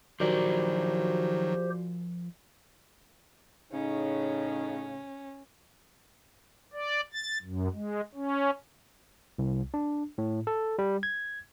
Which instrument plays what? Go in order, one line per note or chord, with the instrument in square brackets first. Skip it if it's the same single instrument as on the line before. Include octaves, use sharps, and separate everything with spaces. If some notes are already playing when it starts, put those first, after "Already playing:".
[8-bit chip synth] D#3 F#3 [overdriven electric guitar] F3 A#4 [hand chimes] F#4 D5 [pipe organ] G4 C5
[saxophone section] A2 C#3 [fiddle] C#4 [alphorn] D#4
[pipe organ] D5
A6
F#2
G#3
C#4
[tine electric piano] C2
D4
A2
A4
G3
G#6